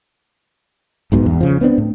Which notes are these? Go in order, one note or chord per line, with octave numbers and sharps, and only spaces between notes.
B1 G#2 B2
E2
C#3 F3
B3 C4 D4
A2